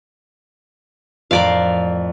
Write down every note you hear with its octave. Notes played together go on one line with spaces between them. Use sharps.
F2 A2 A#4 D5 F5